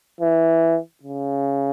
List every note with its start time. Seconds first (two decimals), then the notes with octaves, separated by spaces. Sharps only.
0.21 E3
1.03 C#3